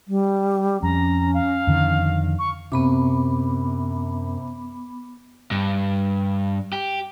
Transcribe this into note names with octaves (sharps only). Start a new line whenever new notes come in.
G3
F2 C#4 A#5
F5
F2 D3 D#3
C#6
F#2 C3 B3 B5 D6
G2
G4